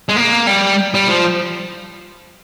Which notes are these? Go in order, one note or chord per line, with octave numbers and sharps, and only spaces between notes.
G#3
A#3
G3
G3
F3